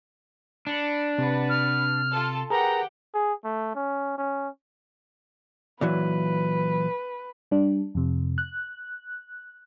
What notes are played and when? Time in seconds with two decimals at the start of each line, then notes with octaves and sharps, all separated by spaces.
0.67 D4 B5 C#7
1.18 C3 B4 F#5
1.49 F6
2.10 F4 A4 A5
2.50 G4 G#4 A#4 B4 F#5 G5 A#5
3.14 G#4
3.45 A3
3.75 C#4
4.18 C#4
5.81 A#2 E3 F#3 B4
7.51 G3 D4
7.95 F2 C3
8.38 F#6